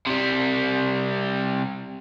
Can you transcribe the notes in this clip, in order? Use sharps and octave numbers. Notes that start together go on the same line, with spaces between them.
C3 G3